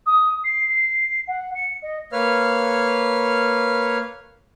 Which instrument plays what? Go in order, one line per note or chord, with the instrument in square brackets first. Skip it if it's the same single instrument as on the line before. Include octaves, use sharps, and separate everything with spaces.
[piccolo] D#6
C7
F#5
C#7
D#5
[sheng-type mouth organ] A#3 B4 C#5 F5 F6